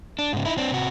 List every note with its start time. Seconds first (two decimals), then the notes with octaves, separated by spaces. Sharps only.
0.19 D4
0.33 G#2 C#3
0.45 D#4 E4
0.58 C4 D4
0.72 C3 F#4